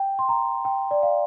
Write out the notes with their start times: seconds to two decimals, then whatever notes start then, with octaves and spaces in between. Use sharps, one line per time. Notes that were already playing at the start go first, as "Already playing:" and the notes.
Already playing: G5
0.19 C6
0.29 A#5
0.65 G5
0.91 D5
1.03 F5